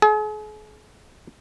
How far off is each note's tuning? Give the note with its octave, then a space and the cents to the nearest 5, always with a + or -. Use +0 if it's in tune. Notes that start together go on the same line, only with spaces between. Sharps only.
G#4 +40